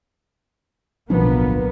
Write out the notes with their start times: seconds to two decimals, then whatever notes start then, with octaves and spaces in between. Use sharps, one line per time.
1.10 D1 B1 F3 A#3 B3 D4